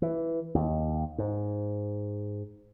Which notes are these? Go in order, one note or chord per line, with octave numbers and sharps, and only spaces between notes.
E3
D#2
G#2